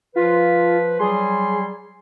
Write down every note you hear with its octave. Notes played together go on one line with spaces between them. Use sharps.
F3 F4 B4
F#3 G3 G#4 C6